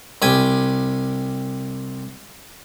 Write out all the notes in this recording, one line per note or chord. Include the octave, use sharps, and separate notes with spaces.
C2 G4 G#5